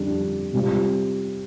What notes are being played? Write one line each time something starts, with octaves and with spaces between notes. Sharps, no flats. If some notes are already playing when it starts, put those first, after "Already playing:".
Already playing: F2 D3 G3 D4
C3 G3 C4 F4